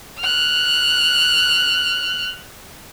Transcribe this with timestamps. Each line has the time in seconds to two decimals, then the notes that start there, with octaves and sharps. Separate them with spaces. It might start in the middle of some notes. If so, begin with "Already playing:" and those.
0.20 F6 F#6